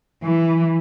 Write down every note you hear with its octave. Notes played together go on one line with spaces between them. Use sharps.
E3